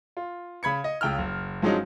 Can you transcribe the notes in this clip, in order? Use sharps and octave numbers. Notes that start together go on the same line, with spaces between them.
F4
C#3 B5 G#6 C#7
D#5
C#2 C#3 G5 E6 F6
F#1
G2 F3 F#3 G#3 C#4 D#4